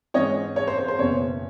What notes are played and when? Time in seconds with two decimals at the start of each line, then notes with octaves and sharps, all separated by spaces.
0.14 G#2 E3 G#3 C#4 C#5 D#5
0.56 C#5
0.67 C5
0.78 C5
0.88 C5
0.98 F#1 E2 B2 C#5